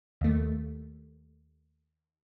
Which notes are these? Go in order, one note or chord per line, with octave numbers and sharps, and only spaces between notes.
D#2 A3